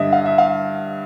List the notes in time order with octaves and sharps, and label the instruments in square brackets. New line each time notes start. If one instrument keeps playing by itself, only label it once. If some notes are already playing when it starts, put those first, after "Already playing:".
Already playing: [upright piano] G2 D3 D#5 E5
F5
E5
F5